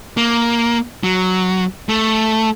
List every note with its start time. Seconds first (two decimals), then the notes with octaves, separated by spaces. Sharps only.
0.17 A#3
1.03 F#3
1.89 A3